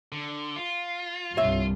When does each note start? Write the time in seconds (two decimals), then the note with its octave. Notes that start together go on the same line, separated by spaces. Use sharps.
0.12 D3
0.56 F4
1.37 C2 G2 C#5 E5